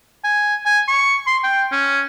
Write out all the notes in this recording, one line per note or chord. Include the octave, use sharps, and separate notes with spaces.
G#5
G#5
C#6
C6
G5
C#4